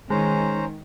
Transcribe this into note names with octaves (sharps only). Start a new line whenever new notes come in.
D#3 G#3 C#4 C5 A#5